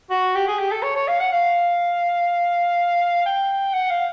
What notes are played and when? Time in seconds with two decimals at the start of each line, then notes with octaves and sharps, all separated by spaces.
0.10 F#4
0.36 G4
0.48 G#4
0.59 G4
0.71 A4
0.83 C#5
0.96 C#5
1.08 F5
1.20 F#5
1.32 F5
3.26 G5
3.73 F#5
3.90 F5